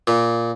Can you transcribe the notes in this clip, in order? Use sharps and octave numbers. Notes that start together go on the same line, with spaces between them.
A#2